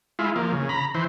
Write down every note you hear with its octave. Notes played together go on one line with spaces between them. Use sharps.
G#3 E4 F4
F3 A#3
C#3
A#5 B5
E3 C5